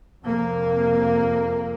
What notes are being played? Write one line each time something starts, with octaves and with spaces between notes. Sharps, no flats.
F2 C3 A#3